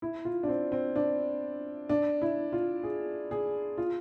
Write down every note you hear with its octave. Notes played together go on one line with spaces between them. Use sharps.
E4
F4
D4
C4
C4
D4
D4
E4
F4
G#4
G#4
F4